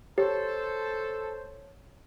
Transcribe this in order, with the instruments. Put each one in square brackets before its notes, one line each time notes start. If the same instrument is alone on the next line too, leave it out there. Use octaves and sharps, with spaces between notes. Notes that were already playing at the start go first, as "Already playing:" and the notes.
[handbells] G4 [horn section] A4 [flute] C5 [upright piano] C#5